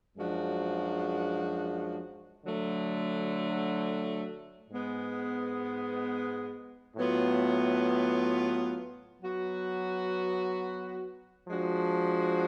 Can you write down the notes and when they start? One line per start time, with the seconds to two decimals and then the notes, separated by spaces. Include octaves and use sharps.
0.17 F#2 F3 G#3 D4 F#4
2.43 D3 F#3 A3
4.70 G#2 G#3 B3
6.96 A2 F#3 B3 F4
9.22 F#3 B3 F#4
11.48 F3 G#3 D4 F#4